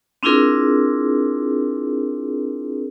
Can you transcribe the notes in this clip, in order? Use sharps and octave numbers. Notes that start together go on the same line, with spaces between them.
C4 D4 E4 F4 G#4 A#4